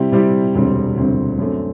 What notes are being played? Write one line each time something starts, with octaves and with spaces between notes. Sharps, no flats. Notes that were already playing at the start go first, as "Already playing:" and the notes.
Already playing: C3 G3 C4 E4 G4
C3 G3 C4 E4 G4
E1 D2 C3 G3 C4
E1 D2 C3 G3 C4
F#2 D3 A3 C4